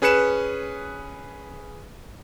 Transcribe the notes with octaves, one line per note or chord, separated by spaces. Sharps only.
C#4 G#4 B4 F#6 C#7 E7